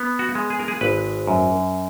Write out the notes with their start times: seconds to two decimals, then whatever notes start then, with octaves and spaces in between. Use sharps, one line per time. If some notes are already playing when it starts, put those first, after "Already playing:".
Already playing: B3
0.19 F#4
0.35 G#3
0.50 G#4
0.59 A#4
0.68 G#4
0.81 G#1 B4
1.27 F#2